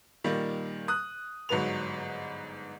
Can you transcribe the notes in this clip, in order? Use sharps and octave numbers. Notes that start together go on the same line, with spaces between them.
A#2 D#3 G3 A#3
D#6 F#6
G1 G#2 F#3 B4 F7